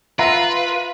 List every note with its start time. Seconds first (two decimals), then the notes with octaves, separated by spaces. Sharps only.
0.19 F4 B4 E5 F#5 A#5